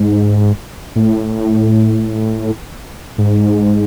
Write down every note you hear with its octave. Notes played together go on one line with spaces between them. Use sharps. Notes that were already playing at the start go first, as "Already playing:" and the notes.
Already playing: G#2
A2
G#2